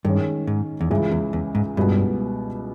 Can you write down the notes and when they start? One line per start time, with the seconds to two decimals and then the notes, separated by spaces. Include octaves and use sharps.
0.05 G2 D#3 G#3 C#4
0.47 G#2
0.81 E2
0.90 C#2 G2 C#3 E3
1.12 E2
1.33 E2
1.55 G#2
1.76 C#2 G2 B2 G3 B3 E4